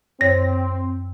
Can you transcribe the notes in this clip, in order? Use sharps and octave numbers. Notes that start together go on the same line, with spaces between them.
F#2 C4 C#5 A#6